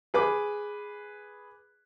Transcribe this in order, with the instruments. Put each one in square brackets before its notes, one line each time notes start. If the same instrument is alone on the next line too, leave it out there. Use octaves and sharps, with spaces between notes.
[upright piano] G#4 B4 D6